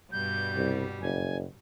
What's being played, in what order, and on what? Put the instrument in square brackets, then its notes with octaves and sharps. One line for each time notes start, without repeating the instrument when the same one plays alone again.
[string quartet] G2 B2 G3 [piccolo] G6
[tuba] C2
[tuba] F#1 [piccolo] G#5